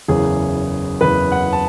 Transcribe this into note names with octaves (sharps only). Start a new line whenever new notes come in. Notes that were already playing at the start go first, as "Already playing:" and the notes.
F#1 E2 C#3 G#4
F#1 E2 C#3 B4
F#5
A5